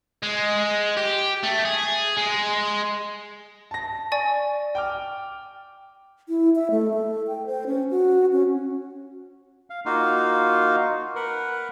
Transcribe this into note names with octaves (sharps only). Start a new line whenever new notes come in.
G#3
G4
A3
G#4
G#3
A5 A#6
D5 G#5 C#6
G5 D6 F6
E4
E5
A3
A4
G5
C5
C#4
F#4
C#4
F5
A#3 D#4 F4 F#4 F5
A#4 B4 F#5